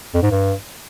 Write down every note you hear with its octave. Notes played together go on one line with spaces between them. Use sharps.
F2
G#2
G2